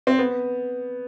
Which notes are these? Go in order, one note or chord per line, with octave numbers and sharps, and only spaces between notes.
C4
B3